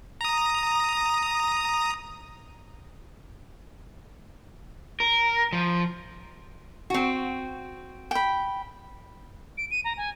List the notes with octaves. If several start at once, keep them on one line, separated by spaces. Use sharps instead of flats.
A#5 D#6
A#4
F3
C4 F#4
G5 B5
D7
D#7
A#5
G#5